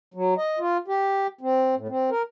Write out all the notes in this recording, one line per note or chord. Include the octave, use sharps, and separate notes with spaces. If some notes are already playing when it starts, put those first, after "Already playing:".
F#3
D#5
F4
G4
C4
A2
C4
A#4